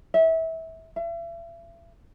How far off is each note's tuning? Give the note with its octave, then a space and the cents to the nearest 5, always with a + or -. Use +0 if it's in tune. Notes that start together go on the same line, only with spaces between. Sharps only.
E5 -25
E5 +40